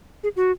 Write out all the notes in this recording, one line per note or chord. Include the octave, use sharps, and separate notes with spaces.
G#4
F#4